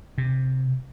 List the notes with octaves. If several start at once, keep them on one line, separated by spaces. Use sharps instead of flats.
C3